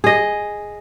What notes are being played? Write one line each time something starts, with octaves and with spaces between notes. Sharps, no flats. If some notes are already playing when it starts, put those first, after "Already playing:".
G#4 D#5